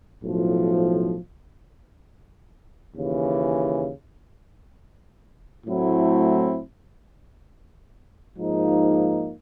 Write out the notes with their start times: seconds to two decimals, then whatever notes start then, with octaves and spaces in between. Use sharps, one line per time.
0.23 B1 A2 F3
2.95 D#2 C#3 E3
5.66 A2 F#3 A3 C4 E4
8.38 G#2 F3 A#3 D#4